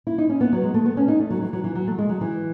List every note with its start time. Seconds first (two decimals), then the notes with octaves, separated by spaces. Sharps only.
0.07 E4
0.18 D#4
0.29 C#4
0.41 B3
0.53 F#3
0.63 G#3
0.74 A3
0.86 B3
0.97 C#4
1.08 D#4
1.20 A3
1.30 F#3
1.42 E3
1.53 F#3
1.64 E3
1.75 F#3
1.87 A3
1.98 G#3
2.09 F#3
2.21 E3